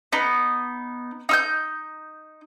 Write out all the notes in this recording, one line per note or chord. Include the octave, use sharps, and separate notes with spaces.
B3 D#4
D#4 E6 G6